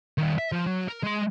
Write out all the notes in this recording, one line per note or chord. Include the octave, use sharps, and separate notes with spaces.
D#3 G3
E5
F3
F#3
A#4
G#3 C6